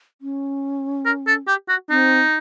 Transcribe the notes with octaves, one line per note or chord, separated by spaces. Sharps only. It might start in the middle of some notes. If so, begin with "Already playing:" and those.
C#4
A#4
A4
G4
F#4
C4 D#4